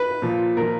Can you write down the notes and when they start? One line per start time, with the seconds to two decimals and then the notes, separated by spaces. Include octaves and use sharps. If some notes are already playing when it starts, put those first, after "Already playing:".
Already playing: B4
0.22 A#2 F3
0.57 A#2 F3 A#4